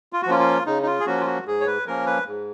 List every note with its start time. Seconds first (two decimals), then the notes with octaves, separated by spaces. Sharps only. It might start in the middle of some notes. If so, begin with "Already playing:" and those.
0.13 F4
0.22 F#4
0.26 F3 A#3 C#4 F4
0.39 F4
0.66 C#3 D#4
0.83 D#4
0.87 F4
1.00 G#4
1.06 F3 A#3 C#4 F#4
1.20 F4
1.26 F#4
1.46 G#2 G#4
1.60 C#5
1.67 B4
1.87 F3 A#3 C#4 A#4
2.06 B4
2.27 G#2